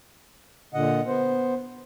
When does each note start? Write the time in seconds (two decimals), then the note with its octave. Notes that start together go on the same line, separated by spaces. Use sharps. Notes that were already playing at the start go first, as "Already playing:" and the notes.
0.74 A#2 D3 D#5 F#5
1.07 B3 C5